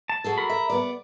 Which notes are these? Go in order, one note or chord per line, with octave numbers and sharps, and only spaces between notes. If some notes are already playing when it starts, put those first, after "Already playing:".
A5
F#3 G#4 A4
A#4 B5
E5
B3 D5